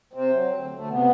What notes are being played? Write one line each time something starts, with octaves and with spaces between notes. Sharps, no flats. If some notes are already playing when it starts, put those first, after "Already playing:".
C3 C4
F#3
D2
D2
A3
C3 B3